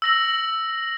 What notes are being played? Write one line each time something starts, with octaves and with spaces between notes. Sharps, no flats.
E6 A#6 F#7